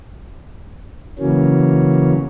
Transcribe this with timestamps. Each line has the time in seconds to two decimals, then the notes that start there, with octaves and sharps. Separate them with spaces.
1.19 C#3 E3 F#3 A#3 C#4